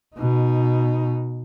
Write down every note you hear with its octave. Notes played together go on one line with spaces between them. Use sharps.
B2 D#4